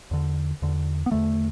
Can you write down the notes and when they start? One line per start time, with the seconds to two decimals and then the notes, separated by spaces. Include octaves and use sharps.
0.11 E2 D3
0.62 E2 D3
1.06 B3
1.11 E2 D3 A3